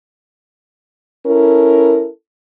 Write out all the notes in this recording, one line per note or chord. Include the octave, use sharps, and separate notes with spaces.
C#4 E4 A4 A#4